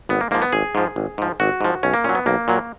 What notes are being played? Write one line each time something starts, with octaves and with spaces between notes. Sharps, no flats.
G#1 B3
A#3
G#2 F3 A#3
B3
G#1 G#4
G#2 F3
G#1
G#2 F3
G#1 F#4
G#2 F3
B1 C#4
A#3
A#2 F#3 C#4
B3
B1 A#3
A#2 F#3